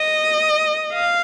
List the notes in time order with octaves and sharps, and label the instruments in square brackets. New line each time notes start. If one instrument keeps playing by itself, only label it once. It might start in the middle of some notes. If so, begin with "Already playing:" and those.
Already playing: [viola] D#5
F5